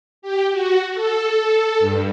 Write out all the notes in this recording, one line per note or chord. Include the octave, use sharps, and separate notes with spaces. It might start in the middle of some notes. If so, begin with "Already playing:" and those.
G4
F#4
A4
G2